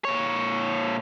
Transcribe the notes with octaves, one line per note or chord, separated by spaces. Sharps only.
A#2 C#5